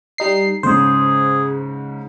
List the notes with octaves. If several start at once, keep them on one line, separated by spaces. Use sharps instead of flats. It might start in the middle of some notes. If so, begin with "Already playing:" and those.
G3 D#4 C7
G#2 C#3 G#4 C5